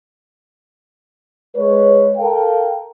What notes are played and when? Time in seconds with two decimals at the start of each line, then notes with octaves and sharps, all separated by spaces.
1.55 G#3 B4 C#5
2.17 A4 A#4 F5 G5